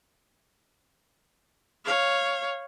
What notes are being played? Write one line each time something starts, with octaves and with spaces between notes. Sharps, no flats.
C#5 F5